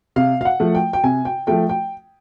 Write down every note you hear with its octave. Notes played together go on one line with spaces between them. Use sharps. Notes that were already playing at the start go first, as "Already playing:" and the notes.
C3 F5
F5
F#5
F3 A3
G5
G5
C3 G#5
G5
F3 A3 G5
G5